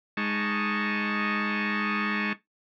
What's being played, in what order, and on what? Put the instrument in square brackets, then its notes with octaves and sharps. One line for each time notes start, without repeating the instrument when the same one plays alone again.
[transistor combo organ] G#3 D#4 A5 C#6